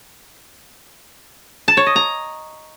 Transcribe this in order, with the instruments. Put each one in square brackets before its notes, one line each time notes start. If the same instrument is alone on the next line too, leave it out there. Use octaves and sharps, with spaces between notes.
[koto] A5
C#5
D#5
A#5